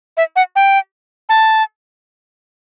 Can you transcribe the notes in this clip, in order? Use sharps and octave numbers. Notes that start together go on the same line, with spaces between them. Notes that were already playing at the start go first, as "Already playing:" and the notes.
E5
F#5
G5
A5